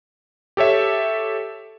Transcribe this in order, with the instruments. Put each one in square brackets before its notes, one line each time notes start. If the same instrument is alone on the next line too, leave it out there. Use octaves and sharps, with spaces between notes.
[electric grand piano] G4 A4 C#5 E5